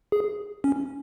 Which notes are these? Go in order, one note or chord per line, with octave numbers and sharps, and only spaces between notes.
G#4
C#4